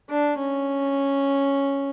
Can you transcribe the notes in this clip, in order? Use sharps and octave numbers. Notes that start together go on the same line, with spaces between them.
D4
C#4